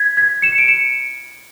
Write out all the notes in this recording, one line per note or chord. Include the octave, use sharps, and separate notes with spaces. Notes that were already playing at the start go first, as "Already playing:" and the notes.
Already playing: G#6 B6
G#6 B6
C#7 E7
D7
C#7 E7